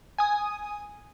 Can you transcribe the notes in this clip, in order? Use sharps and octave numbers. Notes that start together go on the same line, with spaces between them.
G#5 D#6